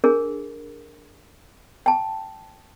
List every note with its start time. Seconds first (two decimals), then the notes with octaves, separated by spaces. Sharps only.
0.04 D4 G#4 A#4
1.86 G5 A5